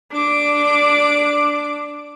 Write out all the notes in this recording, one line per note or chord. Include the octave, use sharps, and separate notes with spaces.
D4 D6